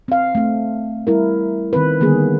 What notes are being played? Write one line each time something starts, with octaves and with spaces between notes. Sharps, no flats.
C4 F5
A3 C4
G3 E4 A#4
D#3 C4 B4
D3 D#3 G3 A#3 B3 G#4